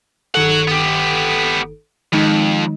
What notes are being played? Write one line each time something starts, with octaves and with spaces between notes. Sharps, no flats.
G1 D#3 A4 C#5 F#5
B3 G4
F2 D#3 G#3 D#4